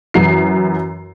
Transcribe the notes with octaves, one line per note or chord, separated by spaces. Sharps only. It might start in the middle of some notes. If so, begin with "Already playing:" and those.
F#2 E3 C7